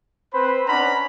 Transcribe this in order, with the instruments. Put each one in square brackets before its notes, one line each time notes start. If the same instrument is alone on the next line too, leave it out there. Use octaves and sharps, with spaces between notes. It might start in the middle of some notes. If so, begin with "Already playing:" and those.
[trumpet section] C4 B4 C5 B5
C#4 D4 F#5 A#5 B5